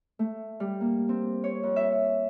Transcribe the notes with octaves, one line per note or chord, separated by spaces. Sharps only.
A3
G3
A#3
C4
C#5
F2
E5